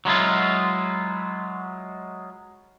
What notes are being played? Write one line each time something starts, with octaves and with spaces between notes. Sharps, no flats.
F#3 G#3 E4 F4